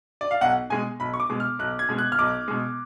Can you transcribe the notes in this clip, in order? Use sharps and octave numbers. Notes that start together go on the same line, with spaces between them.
D5
F5
B1 F#5
B2 G#3 G#5
B1 B5
C#6
D6
B2 G#3
F6
B1 F#6
G#6
B2 G#3
F#6
F6
B1 D6
B2 G#3